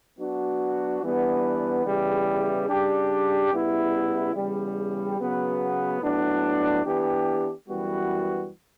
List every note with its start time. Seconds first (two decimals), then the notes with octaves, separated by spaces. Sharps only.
0.19 F#3 B3 D4 F#4
1.02 E3 G3 B3 D4
1.86 E2 C#3 E3 G3
2.69 C#3 G3 D4 G4
3.52 C#3 G3 B3 E4
4.35 E2 C#3 G3
5.19 C#3 F#3 B3
6.02 A2 F#3 B3 D4
6.85 E3 B3 D4 G4
7.68 F#2 E3 G3 B3 F#4